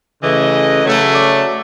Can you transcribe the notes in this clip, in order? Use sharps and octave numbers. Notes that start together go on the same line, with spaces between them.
C#3 E3 A3 D#5
C#3 F#3 A3
D5